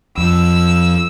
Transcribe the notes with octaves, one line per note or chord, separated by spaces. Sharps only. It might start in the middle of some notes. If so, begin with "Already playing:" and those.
F2 E6